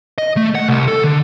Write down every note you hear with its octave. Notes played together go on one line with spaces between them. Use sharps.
D#5
A3
F#5
C2
A4
D3